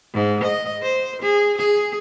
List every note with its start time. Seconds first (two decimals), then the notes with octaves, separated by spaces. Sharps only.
0.14 G#2
0.44 D#5
0.83 C5
1.22 G#4
1.58 G#4